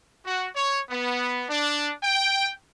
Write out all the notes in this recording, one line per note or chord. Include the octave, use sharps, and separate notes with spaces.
F#4
C#5
B3
D4
G5